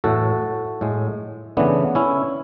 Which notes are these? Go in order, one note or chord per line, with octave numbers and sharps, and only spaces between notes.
A2 E3 A3 F#4 A4
A2 G#3
C#3 E3 A3 B3 D4
C#4 E4